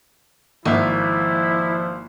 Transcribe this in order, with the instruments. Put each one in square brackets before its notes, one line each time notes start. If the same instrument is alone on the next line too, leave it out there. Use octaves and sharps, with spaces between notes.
[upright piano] G#1 E5 [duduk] F3 [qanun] A#3 [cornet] E4